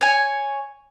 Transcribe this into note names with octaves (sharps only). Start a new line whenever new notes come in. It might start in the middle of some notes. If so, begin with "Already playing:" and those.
C#5 G#5